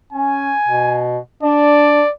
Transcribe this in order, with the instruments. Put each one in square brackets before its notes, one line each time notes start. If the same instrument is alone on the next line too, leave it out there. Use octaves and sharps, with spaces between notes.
[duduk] C#4 [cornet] G#5
[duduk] B2
[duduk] D4 [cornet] D5